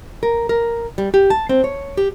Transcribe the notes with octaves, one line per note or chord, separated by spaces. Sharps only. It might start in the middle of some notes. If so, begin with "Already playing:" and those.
A#4
A#4
G3
G4
A5
C4
C#5
G4